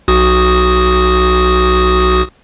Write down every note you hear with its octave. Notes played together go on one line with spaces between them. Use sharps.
B1 F#4 D#6